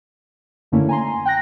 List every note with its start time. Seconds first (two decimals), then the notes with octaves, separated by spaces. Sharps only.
0.72 F#2 D3 A3 A#3 C#4 E4
0.89 G#5 A#5 C6
1.25 G5 F#6 A#6